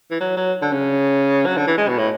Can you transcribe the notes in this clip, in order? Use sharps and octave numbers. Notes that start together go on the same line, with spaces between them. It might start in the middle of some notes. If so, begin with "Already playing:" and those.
E3
F#3
F#3
D3
C#3
F#3
D3
E3
G#3
B2
A2